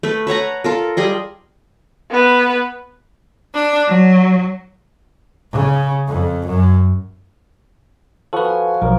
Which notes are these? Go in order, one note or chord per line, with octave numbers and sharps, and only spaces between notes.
A3 B4
B4 C#5 F#5 A#5
F4 A4 A#4
G3 G#4 D#5
B3 B4
D4
F#3
C#3
F2
F#2
F3 F#4 A4 B4
G#5
B1 F3 A#4